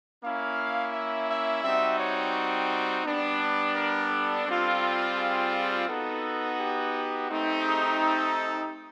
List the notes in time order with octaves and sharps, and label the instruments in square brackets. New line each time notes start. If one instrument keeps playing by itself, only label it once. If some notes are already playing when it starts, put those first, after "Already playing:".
[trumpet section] A#3 C#4 E4 F5
E5
E5
G3 C4 D#4 F#4 E5
C#5
G3 B3 D4
A#4
A4
G3 C4 F4
G#4
G#4
B3 D#4 F#4 A4
G4
A3 C4 D#4 G4
G#4
A4